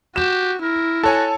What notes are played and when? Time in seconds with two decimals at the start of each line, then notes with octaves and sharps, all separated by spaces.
0.16 F#4 G4 E7
0.62 E4 A#4
1.03 F#4 A4 C#5 G#5 A5